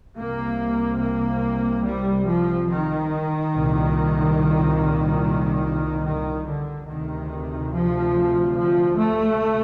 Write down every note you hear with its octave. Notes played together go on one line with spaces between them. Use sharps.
C2 C3 A#3
A#3
G3
F3
D#3
C2 A#2
D#3
D3
D2 C3 D#3
F3
F3
A3